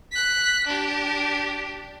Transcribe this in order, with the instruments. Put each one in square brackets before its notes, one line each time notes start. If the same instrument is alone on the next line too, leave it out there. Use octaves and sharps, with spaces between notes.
[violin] F#6 B6
D4 G4